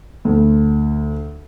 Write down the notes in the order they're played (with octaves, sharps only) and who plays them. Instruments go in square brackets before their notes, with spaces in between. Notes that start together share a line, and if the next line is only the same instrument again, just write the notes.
[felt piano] D2